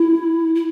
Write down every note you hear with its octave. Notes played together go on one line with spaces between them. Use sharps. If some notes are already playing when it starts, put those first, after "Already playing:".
Already playing: E4
E4